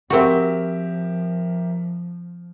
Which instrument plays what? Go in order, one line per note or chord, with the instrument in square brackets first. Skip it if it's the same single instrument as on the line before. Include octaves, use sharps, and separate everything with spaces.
[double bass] F3 [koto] C4 F#4 [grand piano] G4 A#4 E5